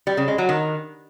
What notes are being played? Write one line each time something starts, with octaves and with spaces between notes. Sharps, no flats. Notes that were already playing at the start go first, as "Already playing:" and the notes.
G3
C#3
G#3
F#3
D#3